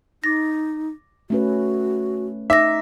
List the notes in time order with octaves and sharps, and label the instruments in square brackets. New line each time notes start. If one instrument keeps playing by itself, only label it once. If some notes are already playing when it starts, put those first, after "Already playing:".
[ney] D#4 [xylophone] D6 A6 A#6
[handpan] A3 C#4 B4 [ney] F#4
[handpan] D#4 [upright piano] E5 [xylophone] D6 A#6